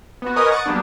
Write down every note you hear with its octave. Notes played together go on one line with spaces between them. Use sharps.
B3 F#4
A#4 B4 C#5 D#5 G#5 D#6
F#5 C#6 D#6 A6 D7
F#3 G3 A#3 B3 D4